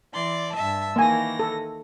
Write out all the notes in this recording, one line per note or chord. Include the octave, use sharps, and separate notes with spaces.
E3 D5 C6
G2 E5 A5
D#3 E3 A#3 G#5 A#6
A4